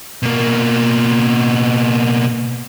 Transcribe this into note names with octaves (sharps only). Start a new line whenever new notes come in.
B2 A#3